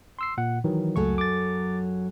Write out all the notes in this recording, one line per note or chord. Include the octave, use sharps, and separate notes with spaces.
C6 E6 C7
A#2 F#5
D#3 E3 F#3
C#2 F#2 F#3 A3 A4 C#6
D6 A6